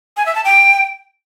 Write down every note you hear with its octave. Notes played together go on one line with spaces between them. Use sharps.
G#5
E5
A5
G5